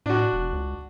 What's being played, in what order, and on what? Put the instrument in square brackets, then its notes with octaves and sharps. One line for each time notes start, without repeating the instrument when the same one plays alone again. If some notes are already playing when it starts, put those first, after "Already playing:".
[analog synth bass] A2 [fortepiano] D4 F#4
[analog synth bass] E1
C#2